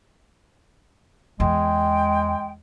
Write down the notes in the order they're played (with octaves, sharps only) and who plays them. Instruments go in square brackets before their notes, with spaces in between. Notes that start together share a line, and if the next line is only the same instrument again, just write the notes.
[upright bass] E2 [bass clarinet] G#3 [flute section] G5